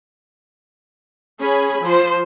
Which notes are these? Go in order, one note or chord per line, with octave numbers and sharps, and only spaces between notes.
C#4 G#4 G#5 B5
F3 C5